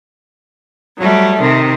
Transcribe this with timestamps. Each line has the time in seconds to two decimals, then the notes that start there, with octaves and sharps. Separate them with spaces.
0.98 F#3 G3 A3
1.39 C3 D#3